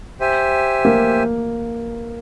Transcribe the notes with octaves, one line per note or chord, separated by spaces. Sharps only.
G4 C5 E5 G#5
A#3